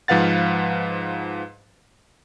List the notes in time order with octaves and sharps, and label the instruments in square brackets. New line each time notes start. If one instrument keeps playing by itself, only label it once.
[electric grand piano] G#2 F3 B4 F5 F#5 A6